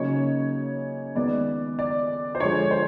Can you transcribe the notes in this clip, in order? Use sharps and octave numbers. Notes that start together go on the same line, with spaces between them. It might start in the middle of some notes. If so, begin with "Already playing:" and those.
Already playing: C#3 F#3 A#3 D#4 C#5
D#3 G#3 B3 D5
D5
C5
D3 F3 G#3 C#5
C5